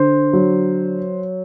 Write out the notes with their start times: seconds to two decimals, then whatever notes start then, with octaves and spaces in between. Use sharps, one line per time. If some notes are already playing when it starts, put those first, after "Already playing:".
Already playing: D3 C5
0.33 F#3